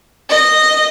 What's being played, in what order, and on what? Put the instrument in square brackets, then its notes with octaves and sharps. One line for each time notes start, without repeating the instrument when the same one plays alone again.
[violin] D#5